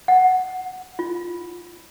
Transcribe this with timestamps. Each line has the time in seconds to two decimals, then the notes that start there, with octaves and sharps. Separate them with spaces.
0.08 F#5
0.99 F4